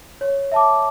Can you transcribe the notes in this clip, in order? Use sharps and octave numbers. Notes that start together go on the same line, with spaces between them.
C#5
E5 A5 D6